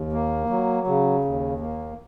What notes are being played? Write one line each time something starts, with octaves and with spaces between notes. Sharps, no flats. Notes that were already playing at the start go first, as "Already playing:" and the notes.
Already playing: D#2
A#3
F#3
C#3
D#2
A#3